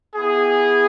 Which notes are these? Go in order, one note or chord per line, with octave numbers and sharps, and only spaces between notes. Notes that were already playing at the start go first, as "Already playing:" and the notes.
B3 E4 G4 G#4